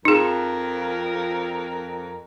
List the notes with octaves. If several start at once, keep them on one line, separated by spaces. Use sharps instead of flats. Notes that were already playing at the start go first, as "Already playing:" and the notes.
F2 D#4 G#4 A#4